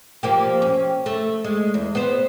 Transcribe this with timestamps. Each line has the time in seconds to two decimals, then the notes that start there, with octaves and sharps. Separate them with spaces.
0.23 F3 A#3 G4
0.62 C#4
1.06 A3
1.44 G#3
1.74 E2
1.95 B3 C5